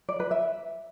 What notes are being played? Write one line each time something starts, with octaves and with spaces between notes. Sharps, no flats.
D5
B4
E5